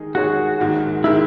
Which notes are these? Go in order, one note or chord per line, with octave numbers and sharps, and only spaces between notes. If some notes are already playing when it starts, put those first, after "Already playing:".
Already playing: D#3 G#3 D#4 G#4
D#3 G#3 D#4 F#4 G#4 C#5
A#1 G#2 D#3 G#3
D#3 G#3 E4